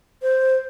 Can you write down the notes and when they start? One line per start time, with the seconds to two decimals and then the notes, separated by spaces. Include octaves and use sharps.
0.22 C5